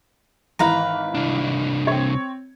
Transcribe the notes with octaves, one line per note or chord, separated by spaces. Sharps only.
G#1 E3 B4 F5 A#5
C2 D4
C4 C#5